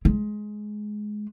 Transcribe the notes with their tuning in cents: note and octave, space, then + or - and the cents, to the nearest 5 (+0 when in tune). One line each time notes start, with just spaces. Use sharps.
G#3 +15